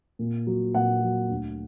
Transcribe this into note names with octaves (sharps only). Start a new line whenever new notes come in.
A#2
F#3
A#2 F#5
F#3
D2